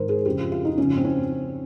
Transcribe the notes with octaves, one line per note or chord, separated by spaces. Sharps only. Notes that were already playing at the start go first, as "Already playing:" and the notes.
Already playing: G#2 D#3 A#4 C5
G#4
F2 C#3 G4
F4
F4
D#4
F2 C#3 C#4
C4
C#4